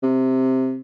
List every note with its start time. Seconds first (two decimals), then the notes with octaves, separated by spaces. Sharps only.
0.03 C3